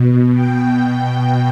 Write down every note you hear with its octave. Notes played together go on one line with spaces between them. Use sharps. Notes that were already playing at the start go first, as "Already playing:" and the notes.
Already playing: B2
G5